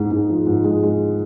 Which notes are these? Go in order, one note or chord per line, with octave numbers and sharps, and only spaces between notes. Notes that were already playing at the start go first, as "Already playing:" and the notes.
Already playing: G#2 G#3
G#2
F3
G#2
G#3
G#3